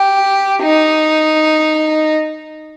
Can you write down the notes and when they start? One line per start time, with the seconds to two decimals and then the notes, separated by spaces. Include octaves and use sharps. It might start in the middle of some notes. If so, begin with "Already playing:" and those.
Already playing: G4
0.63 D#4